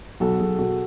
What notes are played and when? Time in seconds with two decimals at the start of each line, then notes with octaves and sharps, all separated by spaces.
0.20 B1 F#4 A4
0.39 B1 G#4
0.58 B2 F#4 A4